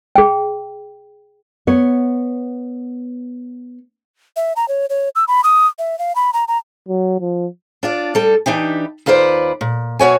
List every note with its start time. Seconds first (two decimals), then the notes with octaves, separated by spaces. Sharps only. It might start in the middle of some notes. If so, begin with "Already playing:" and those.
0.16 G#4 G5
1.67 B3 C#5
4.36 E5
4.56 A#5
4.68 C#5
4.90 C#5
5.15 E6
5.28 B5
5.44 D#6
5.79 E5
5.99 F5
6.16 B5
6.33 A#5
6.48 A#5
6.88 F#3
7.20 F3
7.83 D4 F4 D5
8.15 G3 A4
8.46 E3 D4 D#4 G4
9.06 D#2 F4 B4 C5 D5
9.61 A#2
9.99 B2 F#4 C#5 G#5